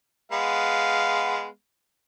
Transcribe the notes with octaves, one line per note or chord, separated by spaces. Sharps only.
G#3 B3 F5